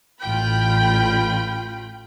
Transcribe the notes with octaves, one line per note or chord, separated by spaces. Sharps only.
A1 F4 G5 B5